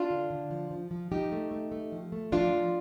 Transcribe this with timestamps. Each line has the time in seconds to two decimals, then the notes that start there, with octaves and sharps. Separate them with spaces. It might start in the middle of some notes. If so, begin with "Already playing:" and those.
Already playing: D4 F4
0.10 D3
0.30 D3
0.51 F3
0.71 F3
0.91 F3
1.11 F3 D#4 G4
1.32 A3
1.51 A3
1.72 A3
1.92 F3
2.12 A3
2.32 F3 D4 F4
2.53 F3